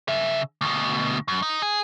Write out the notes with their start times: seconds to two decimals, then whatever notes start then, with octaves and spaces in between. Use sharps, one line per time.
0.08 C#3 E5
0.61 D2 B2
1.28 F#2
1.43 D#4
1.62 G#4